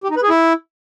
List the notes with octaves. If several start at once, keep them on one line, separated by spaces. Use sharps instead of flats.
G4
D#4
B4
G#4
E4